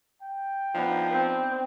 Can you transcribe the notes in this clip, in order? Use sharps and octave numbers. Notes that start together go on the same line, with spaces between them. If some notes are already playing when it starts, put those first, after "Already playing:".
G5
F3 B3 D4 D#4
C4